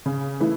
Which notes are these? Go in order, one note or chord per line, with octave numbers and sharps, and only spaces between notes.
C#3
E3 A3 E4